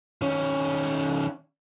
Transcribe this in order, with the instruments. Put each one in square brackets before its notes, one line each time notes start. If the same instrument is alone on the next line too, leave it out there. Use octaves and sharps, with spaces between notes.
[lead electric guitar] D#3 C#4